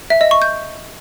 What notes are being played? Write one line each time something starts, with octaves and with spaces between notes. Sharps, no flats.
E5
D#5
C#6
G6